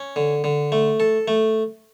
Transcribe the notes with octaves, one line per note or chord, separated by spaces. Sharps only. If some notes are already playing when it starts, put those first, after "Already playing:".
Already playing: C#4
D3
D3
A3
A4
A3